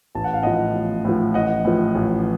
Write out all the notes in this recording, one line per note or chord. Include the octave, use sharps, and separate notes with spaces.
A1 A5
F#5
F5
A2 F3 D#5 F#5
A1
A2 F3
A1 D#5 F#5
A2 F3
A1